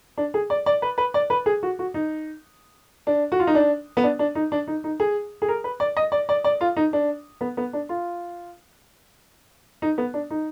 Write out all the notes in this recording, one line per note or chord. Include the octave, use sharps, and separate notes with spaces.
D4
G#4
D5
D5
B4
B4
D5
B4
G#4
F#4
F#4
D#4
D4
F#4
F4
D#4
D4
B3
D4
D4
D#4
D4
D#4
D#4
G#4
G#4
A#4
B4
D5
D#5
D5
D5
D5
F4
D#4
D4
B3
B3
D4
F4
D#4
B3
D4
D#4